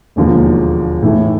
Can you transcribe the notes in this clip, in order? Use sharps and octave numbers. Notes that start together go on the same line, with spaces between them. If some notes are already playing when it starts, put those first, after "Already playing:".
E1 D#2 D3 F3 A#3
A2 E3 A3